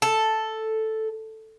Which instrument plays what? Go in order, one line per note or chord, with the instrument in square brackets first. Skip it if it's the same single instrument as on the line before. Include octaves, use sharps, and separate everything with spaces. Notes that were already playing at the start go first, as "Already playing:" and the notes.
[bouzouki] A4